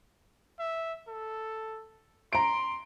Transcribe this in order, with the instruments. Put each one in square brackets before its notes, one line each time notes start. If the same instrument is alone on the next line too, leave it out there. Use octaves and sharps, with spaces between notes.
[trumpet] E5
A4
[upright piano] A#5 D7 [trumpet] C6